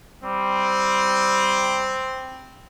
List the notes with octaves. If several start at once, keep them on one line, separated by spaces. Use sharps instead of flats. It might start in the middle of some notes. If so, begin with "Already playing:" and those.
G3 C4